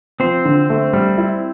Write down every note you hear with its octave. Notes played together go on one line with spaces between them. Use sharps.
F3 C4 C5
D3
A3
G3
E4